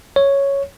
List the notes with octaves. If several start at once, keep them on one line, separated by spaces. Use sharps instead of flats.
C#5